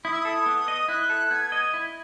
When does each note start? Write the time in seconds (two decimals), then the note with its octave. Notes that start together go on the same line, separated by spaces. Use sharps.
0.05 E4 D#6
0.12 E6
0.20 D#6
0.25 A4
0.46 B3
0.68 D#5
0.88 E4 F#6
1.10 A4
1.31 B3 G#6
1.52 D#5
1.74 E4